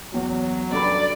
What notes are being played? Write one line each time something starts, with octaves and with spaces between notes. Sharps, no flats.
E2 F#3 C#5
G2 A4 D5 B5